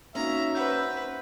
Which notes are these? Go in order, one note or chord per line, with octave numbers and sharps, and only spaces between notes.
A#3 B3 C#4 D#4 F#4 E5 A#5
B4 C5 F#5 G6